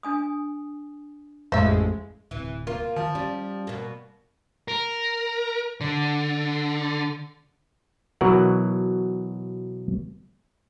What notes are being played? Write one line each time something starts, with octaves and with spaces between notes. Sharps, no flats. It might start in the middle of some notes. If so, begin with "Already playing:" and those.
D4 G#5 D#6
A1 F2 A2 G#3 C5 E5 F5
D1 C3 E3
A#3 F4
D#3 F3
G3 C#4
B2 A#3
A#4
D3
B2 E3 F#3 A#4 F#5